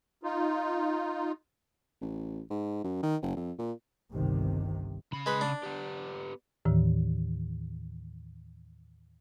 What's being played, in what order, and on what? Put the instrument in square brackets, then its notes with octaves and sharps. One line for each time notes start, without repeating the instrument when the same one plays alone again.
[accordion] D#4 F4
[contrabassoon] A1
G#2
F#2
D#3
F#1
F2
A#2
[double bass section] G1 C2 C3 D#3
[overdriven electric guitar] C#3 B5
[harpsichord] G#3 B4
D4
[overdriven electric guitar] B3 G4
[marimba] D#2 A2 D#3 E3